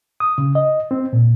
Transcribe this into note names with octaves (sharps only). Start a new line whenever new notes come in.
D#6
C#3
D#5
C4
A#2